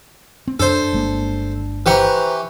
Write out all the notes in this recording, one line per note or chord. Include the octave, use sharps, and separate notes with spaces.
C4
F#2 D4 A4 C5
G1 G#3 A#3
E3 G4 B4 C5 A#5 C#6